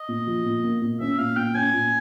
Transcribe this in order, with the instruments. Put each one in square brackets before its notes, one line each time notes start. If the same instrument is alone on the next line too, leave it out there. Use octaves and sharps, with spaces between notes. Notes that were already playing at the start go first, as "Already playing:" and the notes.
Already playing: [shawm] D#5
[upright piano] A#2
F3
A#2
A#3
A#2
[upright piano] C#4 [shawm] E5
[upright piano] A#2 [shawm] F5
[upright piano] A#2 [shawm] G5
[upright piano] C#4 [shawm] G#5
[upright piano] A#2